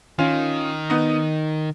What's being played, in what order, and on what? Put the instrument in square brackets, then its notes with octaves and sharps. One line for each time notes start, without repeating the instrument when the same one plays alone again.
[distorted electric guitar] D#3 [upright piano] C#4 F4
[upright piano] B3 D#4